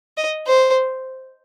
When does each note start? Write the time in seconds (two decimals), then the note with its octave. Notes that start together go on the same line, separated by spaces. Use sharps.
0.17 D#5
0.47 C5